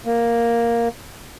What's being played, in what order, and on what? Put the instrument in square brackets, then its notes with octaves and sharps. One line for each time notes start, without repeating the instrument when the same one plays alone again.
[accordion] A#3